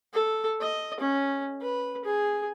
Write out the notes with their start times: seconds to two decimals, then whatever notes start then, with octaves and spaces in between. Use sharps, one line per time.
0.13 A4
0.61 D#5
1.00 C#4
1.61 B4
2.05 G#4